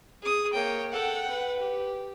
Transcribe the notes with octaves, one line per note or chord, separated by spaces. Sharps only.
G#4 D#6
A#3 C#5 G5
A4 F#5 G5
B4
G4